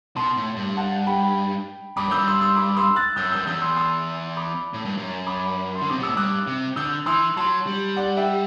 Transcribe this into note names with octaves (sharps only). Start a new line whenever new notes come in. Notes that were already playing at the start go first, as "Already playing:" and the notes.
B2 A5 C6
A2
G2
F#5 A5
G5 B5
G2 B5 D6
F#2 E6 G6
G2
C6 E6
C6 E6
B5 D6
C6 E6
F#6 A6
F#2 E6 G6
F#2 E6 G6
E2 E6 G6
C6 E6
C6 E6
B5 D6
A2
G2
F#2
B5 D6
C6
D3
C3 D6
B2
A2 E6
G2 D6 F#6
C3
D3 E6 G6
E3 C6 E6
F#3 A5 C6
G3
D5 F#5
E5 G5